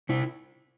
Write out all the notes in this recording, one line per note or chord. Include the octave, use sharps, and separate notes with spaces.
C3 E4